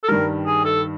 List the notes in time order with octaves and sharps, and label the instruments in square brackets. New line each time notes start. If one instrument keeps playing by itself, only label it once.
[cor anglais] A4
[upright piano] G2 D#3 G3 [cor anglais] A#4
[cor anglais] G#4
A4